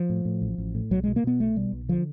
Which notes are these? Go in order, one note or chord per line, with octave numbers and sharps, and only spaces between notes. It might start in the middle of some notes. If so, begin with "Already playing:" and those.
Already playing: F3
A2
A2
A1
A1
A2
B1 F#3
B2 G#3
A#3
B2 B3
B1 A3
B2 G3
B1
D3 F3